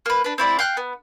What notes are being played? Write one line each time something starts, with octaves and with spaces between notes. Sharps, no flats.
A#3 B4
D4 B4
C4 E4 D5
F5 G5 F#6
B3